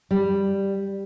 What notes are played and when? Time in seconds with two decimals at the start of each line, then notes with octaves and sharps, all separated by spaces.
0.11 G3